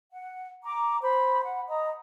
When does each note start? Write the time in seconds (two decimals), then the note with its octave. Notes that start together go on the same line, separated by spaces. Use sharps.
0.12 F#5
0.64 A#5 D6
1.02 C5 B5
1.45 F#5
1.68 D#5 A#5 D#6